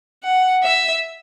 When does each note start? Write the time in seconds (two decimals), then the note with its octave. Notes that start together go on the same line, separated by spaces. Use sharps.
0.23 F#5
0.63 E5